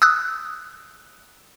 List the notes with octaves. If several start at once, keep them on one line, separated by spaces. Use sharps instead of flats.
D#6 E6 F#6